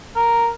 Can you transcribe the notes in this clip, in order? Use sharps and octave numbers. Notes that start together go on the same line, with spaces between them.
A#4